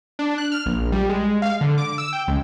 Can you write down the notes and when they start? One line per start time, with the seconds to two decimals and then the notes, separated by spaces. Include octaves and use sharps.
0.19 D4
0.38 F#6
0.52 F6
0.66 A#1
0.92 G3
1.09 G#3
1.42 F5
1.61 D3
1.78 D6
1.98 E6
2.13 G5
2.28 C#2